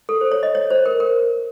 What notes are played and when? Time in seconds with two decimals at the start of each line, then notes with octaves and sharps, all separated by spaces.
0.09 A4
0.21 C5
0.32 C#5
0.43 D#5
0.55 C#5
0.70 C5
0.86 A#4
1.00 A#4